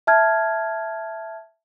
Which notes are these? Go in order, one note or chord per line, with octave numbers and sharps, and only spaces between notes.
E5 A5 F6 G#6